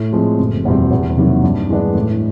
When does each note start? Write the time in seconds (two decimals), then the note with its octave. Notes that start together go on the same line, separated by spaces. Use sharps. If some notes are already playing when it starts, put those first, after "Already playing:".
Already playing: A2
0.13 F3 G#3 C4
0.39 F#1
0.65 E2 B2 G3 C4
0.91 E2
1.17 C3 D#3 F#3 A#3
1.43 G2
1.69 E3 G#3 B3 D4
1.95 A2